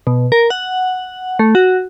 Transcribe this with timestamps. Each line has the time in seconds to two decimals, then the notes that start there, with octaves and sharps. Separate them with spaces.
0.07 B2
0.32 A#4
0.50 F#5
1.39 A3
1.55 F#4